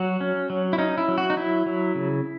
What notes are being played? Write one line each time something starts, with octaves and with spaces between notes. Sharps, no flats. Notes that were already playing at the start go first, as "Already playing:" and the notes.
Already playing: F#3 F#4
C#4
F#3
E4
C#4 D#4
E4
F#3
F#4
D#4
F#3 E4
F#3
C#3